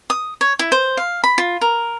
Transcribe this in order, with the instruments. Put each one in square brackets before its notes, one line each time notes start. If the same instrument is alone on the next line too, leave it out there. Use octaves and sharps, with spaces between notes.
[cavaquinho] D#6
C#5
E4
C5
F5
B5
F4
A#4